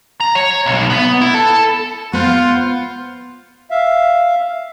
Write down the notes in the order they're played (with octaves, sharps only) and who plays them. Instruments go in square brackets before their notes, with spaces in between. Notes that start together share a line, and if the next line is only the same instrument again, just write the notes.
[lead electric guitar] A#5
C#5
B1
B3
E4
A4
[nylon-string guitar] B3 [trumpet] F4 [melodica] B4 C5 F#5
[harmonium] E5 F5